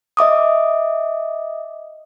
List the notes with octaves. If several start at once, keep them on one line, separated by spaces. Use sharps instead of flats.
D#5 E5 D6 D#6